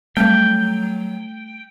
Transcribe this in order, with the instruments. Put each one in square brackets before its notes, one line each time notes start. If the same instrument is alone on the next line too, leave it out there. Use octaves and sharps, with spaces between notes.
[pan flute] F#3 [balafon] G3 C4 [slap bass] A3 [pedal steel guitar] G5